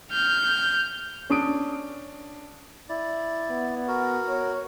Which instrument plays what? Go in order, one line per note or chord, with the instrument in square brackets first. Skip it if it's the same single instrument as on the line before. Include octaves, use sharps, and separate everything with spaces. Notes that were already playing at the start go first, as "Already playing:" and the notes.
[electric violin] F6 G6
[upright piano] C#4 D4 D#6 D7
[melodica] E4 D5
[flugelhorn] B3
[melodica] F#4 A#4
[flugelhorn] C#5